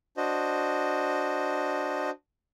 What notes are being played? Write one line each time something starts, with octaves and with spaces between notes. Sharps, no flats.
D4 F#4 C5 D#5